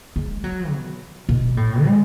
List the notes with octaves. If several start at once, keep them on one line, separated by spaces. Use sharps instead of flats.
G#3
F#3
B2
B2
A2
G#3